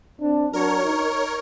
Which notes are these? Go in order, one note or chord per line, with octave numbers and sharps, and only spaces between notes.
C4 D4
F#3 D4 F#4 A#4 C#5
D#4